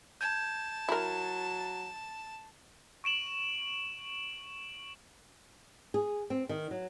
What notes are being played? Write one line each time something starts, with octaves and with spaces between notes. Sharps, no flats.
A5 G6 G#6
F#3 E4 A#4
C#6 D7 E7 F#7
G#4
C4
D#3
F#3